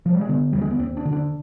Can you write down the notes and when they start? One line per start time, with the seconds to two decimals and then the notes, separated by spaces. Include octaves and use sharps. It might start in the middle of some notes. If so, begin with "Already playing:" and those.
0.06 F3
0.13 G3
0.21 G#3
0.29 D3 B3
0.53 D#2 G3
0.61 G#3
0.71 B3
0.79 D#2 C4
0.97 D4
1.05 D3
1.13 D4